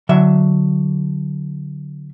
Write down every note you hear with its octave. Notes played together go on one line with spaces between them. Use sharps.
D3 F#3 E5